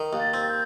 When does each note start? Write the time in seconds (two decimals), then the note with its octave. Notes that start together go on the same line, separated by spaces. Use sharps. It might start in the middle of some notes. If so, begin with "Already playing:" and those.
Already playing: D#3
0.13 D#2
0.20 A6
0.34 C4
0.48 G6